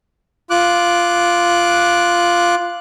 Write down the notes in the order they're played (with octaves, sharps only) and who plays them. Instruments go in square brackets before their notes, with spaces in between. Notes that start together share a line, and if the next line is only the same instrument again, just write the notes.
[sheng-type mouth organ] F4 D6 F#6